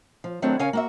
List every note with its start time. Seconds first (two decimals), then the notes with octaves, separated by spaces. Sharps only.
0.24 F3
0.42 D#3 F#3 A3 B3 C4 D4
0.59 C#3 C#4 A#4 F5 G#5
0.73 A#3 F#4 E5